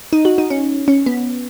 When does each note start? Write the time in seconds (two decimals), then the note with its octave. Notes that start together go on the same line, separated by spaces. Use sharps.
0.13 D#4
0.25 F#4
0.38 D#4
0.50 C#4
0.88 C#4
1.06 B3